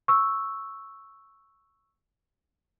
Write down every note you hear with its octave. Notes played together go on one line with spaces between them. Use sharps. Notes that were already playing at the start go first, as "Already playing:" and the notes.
C#6 E6